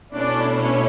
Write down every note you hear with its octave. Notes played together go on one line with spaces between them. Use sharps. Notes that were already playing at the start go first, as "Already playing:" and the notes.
B2 A3 C#4 D4 E4 D5
C#4 C#5